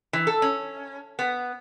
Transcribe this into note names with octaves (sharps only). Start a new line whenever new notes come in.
E3
A4
C#4
B3